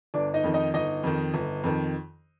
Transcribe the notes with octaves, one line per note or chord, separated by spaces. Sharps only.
G1 D4 D5
D#4 D#5
F2 D#3
D#4 D#5
G1 D#4 D#5
F2 D#3
G1
F2 D#3